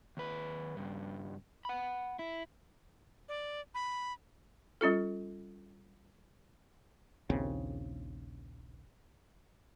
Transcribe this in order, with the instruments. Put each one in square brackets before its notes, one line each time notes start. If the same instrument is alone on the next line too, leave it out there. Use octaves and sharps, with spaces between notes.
[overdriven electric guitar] D#2 B4
G2 C#3
F#5 B5
E4
[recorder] D5
B5
[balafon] G3 C#4 F4 A4
[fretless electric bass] A#1 D#2 C#3 C4